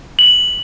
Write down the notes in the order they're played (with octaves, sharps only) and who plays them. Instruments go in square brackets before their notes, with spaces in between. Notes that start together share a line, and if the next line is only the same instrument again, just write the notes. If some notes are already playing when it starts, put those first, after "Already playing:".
[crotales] F#7